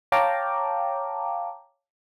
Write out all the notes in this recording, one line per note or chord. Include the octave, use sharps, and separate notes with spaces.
C#5 F5 G5 A5 A#5 D6